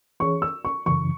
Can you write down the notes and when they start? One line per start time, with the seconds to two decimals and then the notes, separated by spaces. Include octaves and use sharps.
0.20 E3 C#4 G#4 C#5 C#6
0.42 E6
0.65 C#6
0.86 F#2 C#3 E3 C#6